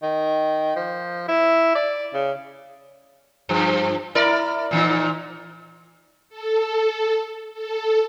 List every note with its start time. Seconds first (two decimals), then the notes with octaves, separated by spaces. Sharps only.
0.02 D#3
0.76 F3
1.28 E4
1.75 D5
2.14 C#3
3.49 G2 F3
4.15 E4 A#4 D5
4.71 A#2 E3 D#4
6.29 A4
7.53 A4